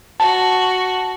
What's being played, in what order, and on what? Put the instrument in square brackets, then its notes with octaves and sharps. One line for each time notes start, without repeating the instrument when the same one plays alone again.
[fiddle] F#4 [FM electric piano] A5